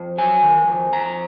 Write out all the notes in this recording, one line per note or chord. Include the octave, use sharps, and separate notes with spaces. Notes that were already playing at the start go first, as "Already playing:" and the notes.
Already playing: F2
F#3 G#5
D#3
F2
F2 A#5